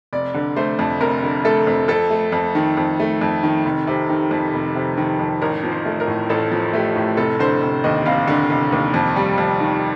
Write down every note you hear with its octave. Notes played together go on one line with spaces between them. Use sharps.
F1 D5
D3
A3 C5
F2
F1 A#4
D3
A3 A4
F2
F2 A4
A3
F2
D#3
F2
A3
F2
D#3
F1
C3
D#3
F2
F1
C3
D#3
F2
A1 A#4
F3
C5
A3
A#4
A2
A1 A4
F3
A3 G4
A2
F1 A4
D3 C5
F1
D#2 D#5
F1 F5
D3
F1
D#2
F2
G3
F2
D#3